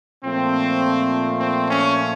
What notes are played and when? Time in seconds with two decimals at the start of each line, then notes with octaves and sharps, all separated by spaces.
0.25 A#2 F3 A3 C4
1.40 C4
1.69 C#4